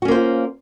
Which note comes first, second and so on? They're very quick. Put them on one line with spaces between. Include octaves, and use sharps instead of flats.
F#4 C#4 A#3 C5 F4